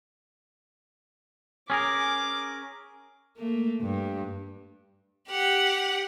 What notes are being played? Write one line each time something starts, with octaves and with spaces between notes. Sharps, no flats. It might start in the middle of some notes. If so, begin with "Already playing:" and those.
C#4 G#4 A#4 D6
A3 A#3
G2
G4 F#5